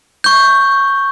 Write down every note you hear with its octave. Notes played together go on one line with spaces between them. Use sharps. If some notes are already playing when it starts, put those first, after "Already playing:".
C#6 G6